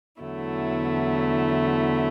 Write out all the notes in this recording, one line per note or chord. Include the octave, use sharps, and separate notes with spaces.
E2 D3 F#3 A3 E4